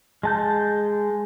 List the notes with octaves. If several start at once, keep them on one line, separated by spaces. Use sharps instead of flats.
G#3 A5 G6